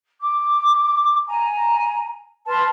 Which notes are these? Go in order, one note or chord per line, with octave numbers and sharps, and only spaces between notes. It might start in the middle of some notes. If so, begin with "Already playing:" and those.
D6
G#5 A#5
B4 A5 C6 F6